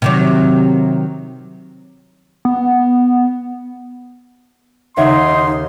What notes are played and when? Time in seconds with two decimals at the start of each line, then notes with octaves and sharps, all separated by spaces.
0.02 C3 D#3 F#3
2.45 B3
4.97 D#2 C#3 D#4 C#5 E5 F#5 C6